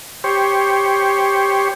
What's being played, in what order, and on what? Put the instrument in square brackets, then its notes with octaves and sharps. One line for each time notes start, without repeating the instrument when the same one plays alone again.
[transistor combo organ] G4 C5 C#5